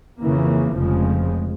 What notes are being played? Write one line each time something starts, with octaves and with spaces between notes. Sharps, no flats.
F2 C#3 E3 A#3
F1 F2 C#3 F3 G#3